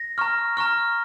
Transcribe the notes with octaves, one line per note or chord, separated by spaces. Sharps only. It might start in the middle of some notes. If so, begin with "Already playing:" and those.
Already playing: A#6
A#5 C#6 F6
A#5 C#6 F6